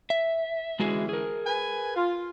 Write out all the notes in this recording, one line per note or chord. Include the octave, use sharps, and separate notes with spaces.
E5
D3 E3 G#3 C#4 F#4 G#4
G#4 A#4
B4 G#5
F4